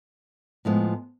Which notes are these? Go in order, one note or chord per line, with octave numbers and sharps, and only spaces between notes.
A2 F3 G#3 B3